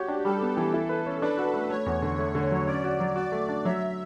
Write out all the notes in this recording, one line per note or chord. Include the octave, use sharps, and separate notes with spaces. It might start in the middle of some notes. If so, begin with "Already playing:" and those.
Already playing: F#4 G4 C#5
D4
G3 A4
B3
E3
E4
B4
C#4
D4 B4
F#4
A3
A3 C#5
E2
D3
A3
D3
F#3
C#4 D5
F#4
F#3
F#4 D5
A3
D4
F#3 E5